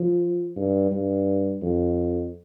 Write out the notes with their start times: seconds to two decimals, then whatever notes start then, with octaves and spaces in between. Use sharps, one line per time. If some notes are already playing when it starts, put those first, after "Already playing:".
Already playing: F3
0.56 G2
0.92 G2
1.62 F2